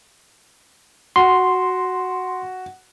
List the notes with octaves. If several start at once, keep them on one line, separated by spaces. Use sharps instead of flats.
F#4 C6